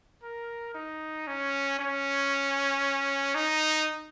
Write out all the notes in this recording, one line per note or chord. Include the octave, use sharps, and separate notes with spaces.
A#4
D#4
C#4
C#4
D#4